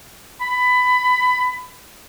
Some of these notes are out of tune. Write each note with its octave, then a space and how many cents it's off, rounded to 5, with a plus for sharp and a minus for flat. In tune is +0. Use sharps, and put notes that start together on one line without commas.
B5 +20